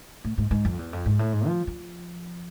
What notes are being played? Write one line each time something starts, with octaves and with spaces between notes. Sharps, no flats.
A2
G#2
G#2
F2
E2
F2
G#2
A2
G#2
F3
F3